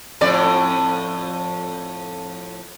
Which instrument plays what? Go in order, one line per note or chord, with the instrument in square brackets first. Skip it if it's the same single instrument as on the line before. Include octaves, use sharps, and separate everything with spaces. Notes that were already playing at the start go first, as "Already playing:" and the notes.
[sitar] F2 A2 D5